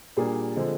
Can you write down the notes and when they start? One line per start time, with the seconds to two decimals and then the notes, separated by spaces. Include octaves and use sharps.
0.17 A#2 G3 A#3 D4 G#4
0.56 D3 F3 G#3 C4